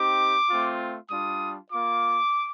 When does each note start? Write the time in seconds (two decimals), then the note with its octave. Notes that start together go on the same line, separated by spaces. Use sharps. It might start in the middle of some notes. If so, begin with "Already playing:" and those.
Already playing: C4 D#4 G4 D6
0.49 A3 C4 F4
1.10 G3 D4 F4 D#6
1.71 A#3 F4 D6